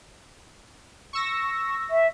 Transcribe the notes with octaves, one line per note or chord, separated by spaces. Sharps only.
C#6 E6 A#6
E5